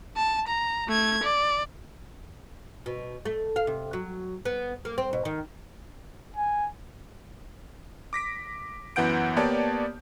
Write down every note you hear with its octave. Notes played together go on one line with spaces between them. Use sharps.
A5
A#5
A3 G#6
D5
B2
A3
F5
C3
F#3
B3
A#3
C4
B2
D#3
G#5
D6 A#6 B6 D7
F#2 E3 B3 F#5 G6 D7
A#3 B3 G4 C#5 D5 A5